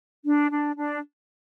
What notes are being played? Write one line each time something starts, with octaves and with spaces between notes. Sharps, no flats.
D4
D4
D4